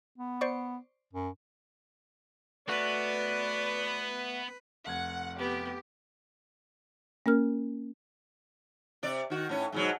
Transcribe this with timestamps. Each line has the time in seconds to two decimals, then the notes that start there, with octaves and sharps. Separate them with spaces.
0.18 B3
0.41 C5 D5 C#6
1.13 F#2
2.69 A3 B3 F#4 B4 D5
4.87 F1 F#5 G#6
5.38 B3 G4
7.26 A#3 C#4 A#4 F6
9.03 C3 D5
9.30 D#3 F#4
9.49 A2 C#4
9.72 G#2 B2 F#3